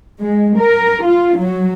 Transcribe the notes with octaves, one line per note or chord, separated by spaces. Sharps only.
G#3
A#4
F4
F#3